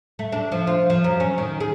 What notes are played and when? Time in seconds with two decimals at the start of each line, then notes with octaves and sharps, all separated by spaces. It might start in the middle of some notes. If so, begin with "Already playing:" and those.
0.19 A3
0.32 D4
0.52 F3
0.67 F4
0.90 F3
1.04 F#2
1.20 C#4
1.38 D#3
1.60 G#4